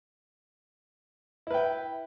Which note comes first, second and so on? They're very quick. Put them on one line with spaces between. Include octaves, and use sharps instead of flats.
E4 B4 G5